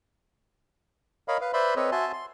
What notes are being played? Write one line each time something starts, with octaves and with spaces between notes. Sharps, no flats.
A#4 C#5 D#5 F5 B5
B4 F5
B4 C5 D5 E5 B5 C6
C4 A4 B4 C#5 D#5
F#4 E5 G#5 A5 C6
C6